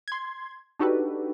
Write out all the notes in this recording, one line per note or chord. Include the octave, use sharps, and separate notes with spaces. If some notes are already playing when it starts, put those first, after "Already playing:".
C6 G#6
D4 D#4 F#4 G4 A4 B4